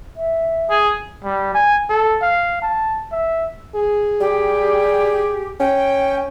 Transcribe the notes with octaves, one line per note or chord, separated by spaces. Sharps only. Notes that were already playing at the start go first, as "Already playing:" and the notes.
E5
G#4
G3
G#5
A4
F5
A5
E5
G#4
G3 G4
C#4 G5